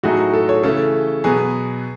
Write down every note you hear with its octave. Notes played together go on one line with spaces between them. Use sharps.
A2 F#3 A3 D#4 F#4 G#4
A4
C#5
C#3 E3 A3 A4
B2 F#3 B3 G#4